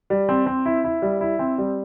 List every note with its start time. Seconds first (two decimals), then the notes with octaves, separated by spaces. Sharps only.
0.10 G3
0.29 C4
0.46 C4
0.66 E4
0.84 E4
1.02 G3
1.21 E4
1.39 C4
1.58 G3